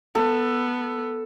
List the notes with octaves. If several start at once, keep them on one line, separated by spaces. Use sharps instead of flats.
B3 A4